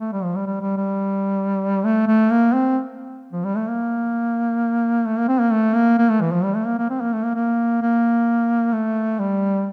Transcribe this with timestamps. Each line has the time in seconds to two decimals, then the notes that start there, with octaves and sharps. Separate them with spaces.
0.01 A3
0.13 G3
0.23 F3
0.36 G3
0.47 G3
0.62 G3
0.77 G3
1.84 A3
2.08 A3
2.31 A#3
2.53 C4
3.33 F3
3.44 G3
3.56 A3
3.68 A#3
5.06 A3
5.18 A#3
5.28 C4
5.40 A#3
5.52 A3
5.74 A#3
5.98 A#3
6.09 A3
6.21 E3
6.32 F3
6.43 G3
6.55 A3
6.66 A#3
6.78 A#3
6.90 C4
7.01 A#3
7.13 A3
7.24 A#3
7.35 A#3
7.82 A#3
8.73 A3
9.19 G3